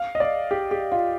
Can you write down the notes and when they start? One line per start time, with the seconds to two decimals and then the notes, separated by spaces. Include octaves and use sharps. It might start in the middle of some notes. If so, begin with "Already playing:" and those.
Already playing: F5
0.15 D#5
0.20 D5
0.51 G4
0.71 G4
0.92 F4